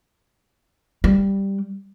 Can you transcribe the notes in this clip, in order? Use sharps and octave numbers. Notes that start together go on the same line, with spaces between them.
G3